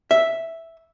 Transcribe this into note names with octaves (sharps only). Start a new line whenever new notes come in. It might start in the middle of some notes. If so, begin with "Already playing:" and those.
E5